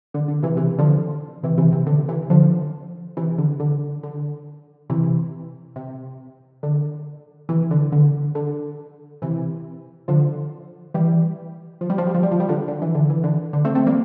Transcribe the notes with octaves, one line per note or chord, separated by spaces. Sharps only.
D3
D3
C3 E3
C3 E3
D3 F3
C3 E3
C3 E3
C3
D3
C3 E3
D3 F3
C3 E3
D3
D3
D3
C3 E3
C3
D3
C3 E3
D3
D3
D3
C3 E3
D3 F3
E3 G3
F3
G3
F3
G3
F3
G3
F3
G3
D3 F3
D3
E3
D3
E3
D3
D3
A3 C4
A3 C4
G3 A#3